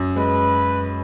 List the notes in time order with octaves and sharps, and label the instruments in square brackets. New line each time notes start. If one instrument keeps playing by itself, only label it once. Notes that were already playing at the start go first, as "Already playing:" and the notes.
Already playing: [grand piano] F#2
[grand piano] G#3 [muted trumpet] B4